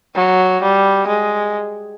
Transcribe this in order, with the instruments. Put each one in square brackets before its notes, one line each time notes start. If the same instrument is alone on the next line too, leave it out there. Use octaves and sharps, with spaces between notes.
[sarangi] F#3
G3
G#3